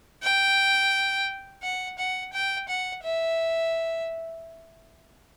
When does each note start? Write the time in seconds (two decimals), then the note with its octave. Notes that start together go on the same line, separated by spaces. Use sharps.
0.23 G5
1.63 F#5
1.99 F#5
2.33 G5
2.68 F#5
3.04 E5